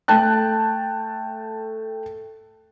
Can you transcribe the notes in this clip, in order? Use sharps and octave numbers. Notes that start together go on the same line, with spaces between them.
A3 G5 A5 F#6